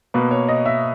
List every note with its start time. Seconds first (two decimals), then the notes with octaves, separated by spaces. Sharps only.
0.14 B2 A#3 B4
0.31 C#5
0.48 D#5
0.66 E5